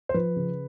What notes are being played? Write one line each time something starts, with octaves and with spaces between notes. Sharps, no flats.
C5
F3 B4
C#3